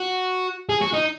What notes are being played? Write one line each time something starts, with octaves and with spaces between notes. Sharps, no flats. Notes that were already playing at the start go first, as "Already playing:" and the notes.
Already playing: F#4
G#4
F#4
D#4